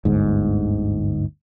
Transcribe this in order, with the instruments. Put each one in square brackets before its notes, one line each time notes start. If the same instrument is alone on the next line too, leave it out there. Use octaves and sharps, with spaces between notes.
[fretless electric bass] G1 D2 G#2